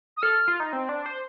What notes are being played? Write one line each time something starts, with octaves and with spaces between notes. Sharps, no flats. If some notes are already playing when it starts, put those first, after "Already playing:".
D#6
A4 F6
F4
D#4
C4
D4
C5